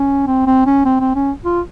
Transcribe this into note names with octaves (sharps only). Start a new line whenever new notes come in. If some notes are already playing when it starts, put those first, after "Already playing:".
Already playing: C#4
C4
C4
C#4
C4
C4
C#4
F4